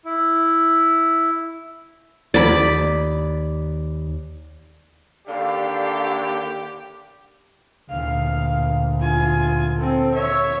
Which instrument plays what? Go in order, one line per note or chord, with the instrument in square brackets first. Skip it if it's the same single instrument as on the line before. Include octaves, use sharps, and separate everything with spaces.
[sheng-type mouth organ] E4
[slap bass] D#2 [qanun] D5 B5
[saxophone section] D#2 D3 D4 [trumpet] G4 [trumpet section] A4 D5 [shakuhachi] F5
[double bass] D2 A#2 [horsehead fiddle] F5
[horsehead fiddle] F4 G#5
C4 A4
C#5 E5